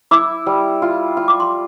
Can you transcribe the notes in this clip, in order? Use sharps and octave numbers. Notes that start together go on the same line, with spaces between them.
E4 D6
G3
F4
F4
D6
C6